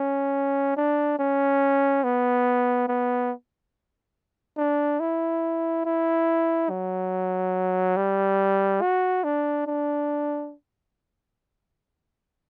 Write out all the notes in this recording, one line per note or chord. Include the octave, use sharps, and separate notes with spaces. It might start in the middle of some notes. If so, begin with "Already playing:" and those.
Already playing: C#4
D4
C#4
B3
B3
D4
E4
E4
F#3
G3
F#4
D4
D4